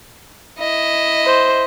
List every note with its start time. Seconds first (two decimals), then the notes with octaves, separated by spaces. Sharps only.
0.59 E4 D#5
1.25 C5